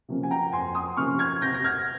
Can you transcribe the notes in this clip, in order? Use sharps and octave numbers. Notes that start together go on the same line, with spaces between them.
C3 F3 A#3 C#4
G#5
G5 A#5
F2 G#5 C6
C6 D#6
C3 F3 A#3 C#4 C#6 F6
F6 G#6
C3 G6 A#6
A#6
F6 G#6